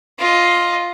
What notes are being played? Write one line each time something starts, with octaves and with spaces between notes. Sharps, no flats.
F4 D#5